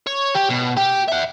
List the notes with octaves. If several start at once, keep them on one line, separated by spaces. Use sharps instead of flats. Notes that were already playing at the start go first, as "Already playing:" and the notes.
C#5
G4
B2
G4
E5 F#5